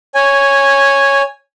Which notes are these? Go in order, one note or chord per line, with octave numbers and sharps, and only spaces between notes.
C#5 G#5